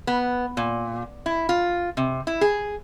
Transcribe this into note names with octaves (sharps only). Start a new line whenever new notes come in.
B3
A#2
E4
F4
C3
E4
G#4